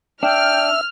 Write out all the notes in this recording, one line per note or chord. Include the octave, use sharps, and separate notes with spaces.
D4 E5 G5 F6